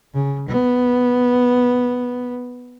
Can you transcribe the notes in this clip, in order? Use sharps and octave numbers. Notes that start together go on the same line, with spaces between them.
C#3
B3